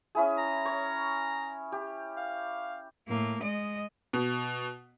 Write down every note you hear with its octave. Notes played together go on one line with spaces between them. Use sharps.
C#4 E4 G#4
A#5
C#5
G4
F5
A2 A#3
G#3 D#5
B2